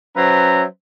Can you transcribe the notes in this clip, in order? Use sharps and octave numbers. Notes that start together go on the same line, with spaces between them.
F#3 C#4 B4 C5 E5 A#5